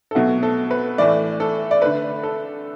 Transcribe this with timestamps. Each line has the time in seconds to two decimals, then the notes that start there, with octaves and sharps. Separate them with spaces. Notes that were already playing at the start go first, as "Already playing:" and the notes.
0.11 A4
0.15 B2 F#3 A3 F#4
0.43 A4
0.71 B4
0.98 A2 E3 A3 D5
1.40 A4
1.71 D5
1.81 D3 A3 B4
2.23 A4